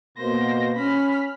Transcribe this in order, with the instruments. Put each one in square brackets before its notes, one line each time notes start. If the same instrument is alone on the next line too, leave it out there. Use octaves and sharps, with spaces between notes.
[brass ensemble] B2 A#3 [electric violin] C5 A#6
[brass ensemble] C#4 [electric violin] B5 F6